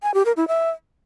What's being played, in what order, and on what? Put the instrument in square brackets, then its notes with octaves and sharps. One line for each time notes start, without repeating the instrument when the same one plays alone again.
[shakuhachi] G#5
G4
A#4
E4
E5